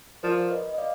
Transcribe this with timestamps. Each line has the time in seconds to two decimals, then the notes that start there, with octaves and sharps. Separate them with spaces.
0.23 F3 A#4 D5
0.51 B4 D#5
0.69 D#5
0.78 D5 F5